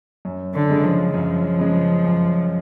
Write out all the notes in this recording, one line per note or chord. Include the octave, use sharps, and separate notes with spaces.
F#2
D3
C#3 G#3
F3
F#2 F3
C#3 G#3
F#2